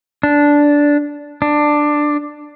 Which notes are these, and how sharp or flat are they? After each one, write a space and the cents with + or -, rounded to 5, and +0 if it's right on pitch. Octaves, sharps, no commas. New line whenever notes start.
D4 -10
D4 +10